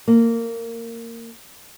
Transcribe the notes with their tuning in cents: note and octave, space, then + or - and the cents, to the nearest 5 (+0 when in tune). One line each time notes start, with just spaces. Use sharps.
A#3 -20